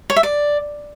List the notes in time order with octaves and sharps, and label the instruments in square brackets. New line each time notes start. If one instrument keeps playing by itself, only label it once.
[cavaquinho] C#5
E5
D5